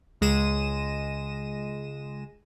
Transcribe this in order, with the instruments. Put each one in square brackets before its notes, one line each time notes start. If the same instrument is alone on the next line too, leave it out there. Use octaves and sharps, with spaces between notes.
[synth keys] C#2 G#3 A#6 D#7 E7